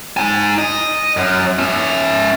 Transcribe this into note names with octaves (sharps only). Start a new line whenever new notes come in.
D#4 G#5
D#5
F#2
C#4 E5